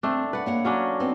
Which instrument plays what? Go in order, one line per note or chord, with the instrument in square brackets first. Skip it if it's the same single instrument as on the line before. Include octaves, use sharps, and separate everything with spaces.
[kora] A3 D4 [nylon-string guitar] C4
[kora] B4 [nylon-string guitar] D5 F#5
[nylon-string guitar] A#3 C#5 F#5
[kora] F#3 C#4 D4
[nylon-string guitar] B3 C4 D#4